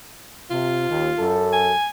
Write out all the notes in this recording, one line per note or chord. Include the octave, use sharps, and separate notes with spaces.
C3 F4
D#2
F#2 A4
G#5